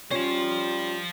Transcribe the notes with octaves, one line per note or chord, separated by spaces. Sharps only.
G3 C#4 F4 C5 F5